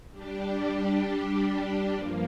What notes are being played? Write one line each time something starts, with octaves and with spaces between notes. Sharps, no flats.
G3 D4 G4
G2 F3 A#3